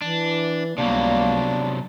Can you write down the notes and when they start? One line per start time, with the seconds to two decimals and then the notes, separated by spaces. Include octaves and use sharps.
0.02 E3 D4
0.78 C#2 C3 F#3 G3 A#3 B3 D4